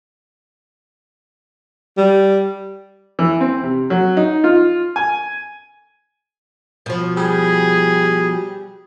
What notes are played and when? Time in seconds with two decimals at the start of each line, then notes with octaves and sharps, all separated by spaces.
1.98 G3
3.19 E3
3.41 C4
3.63 C3
3.90 F#3
4.17 D#4
4.44 F4
4.96 G#5
6.86 B2 F3
7.17 G3 G#4